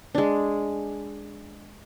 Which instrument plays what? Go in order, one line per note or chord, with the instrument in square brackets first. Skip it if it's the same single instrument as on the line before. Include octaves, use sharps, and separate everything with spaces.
[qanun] G#3 D4